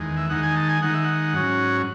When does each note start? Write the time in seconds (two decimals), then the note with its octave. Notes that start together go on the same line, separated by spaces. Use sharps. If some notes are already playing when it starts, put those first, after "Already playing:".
Already playing: E2 D#3 G#3
0.17 E5
0.29 D#3 G#3 D#4 F#5
0.43 G#5
0.56 A5
0.69 G#5
0.82 D#3 G#3 D#4 F#5
0.94 E5
1.04 F#5
1.34 G#2 F#3 C#4